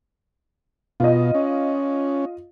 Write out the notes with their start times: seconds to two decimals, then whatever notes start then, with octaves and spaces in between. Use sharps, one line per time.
1.00 B2 F4 D#5
1.35 C#4